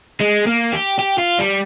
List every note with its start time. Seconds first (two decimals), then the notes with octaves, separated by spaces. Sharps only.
0.20 G#3
0.47 A#3
0.73 G4
0.99 G4
1.18 F4
1.39 G3